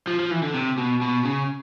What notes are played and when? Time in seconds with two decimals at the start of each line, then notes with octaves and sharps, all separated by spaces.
0.07 F3
0.19 F3
0.31 E3
0.43 D3
0.54 C3
0.78 B2
1.02 B2
1.25 C#3